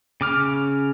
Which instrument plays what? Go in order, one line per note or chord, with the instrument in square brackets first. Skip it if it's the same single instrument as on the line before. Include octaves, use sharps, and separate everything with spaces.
[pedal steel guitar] C#3 D6 F6